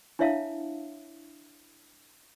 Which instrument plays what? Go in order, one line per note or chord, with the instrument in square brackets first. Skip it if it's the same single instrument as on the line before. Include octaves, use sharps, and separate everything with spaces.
[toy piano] D4 E4 C#5 E5 F5 A5